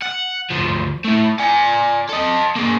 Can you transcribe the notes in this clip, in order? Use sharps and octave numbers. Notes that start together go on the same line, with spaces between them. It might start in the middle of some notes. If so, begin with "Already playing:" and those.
F#5
D2 F3
A3 E4
D5 G#5
A4 D#5
A#3 G#4